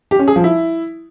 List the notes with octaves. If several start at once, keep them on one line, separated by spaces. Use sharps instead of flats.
G4
C#4
G#4
F3
E4